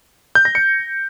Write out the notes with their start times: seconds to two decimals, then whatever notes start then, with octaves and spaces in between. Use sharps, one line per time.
0.35 G6
0.45 A#6
0.55 C#7